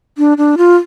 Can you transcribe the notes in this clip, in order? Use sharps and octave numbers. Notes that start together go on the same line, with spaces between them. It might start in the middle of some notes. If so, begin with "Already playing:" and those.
D4
D4
F4